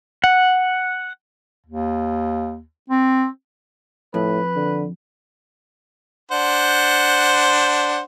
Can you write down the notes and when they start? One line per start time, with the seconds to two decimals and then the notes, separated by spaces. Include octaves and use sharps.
0.24 F#5
1.67 D#2
2.90 C4
4.14 F2 A2 B4
4.56 D3
6.31 D4 C5 F#5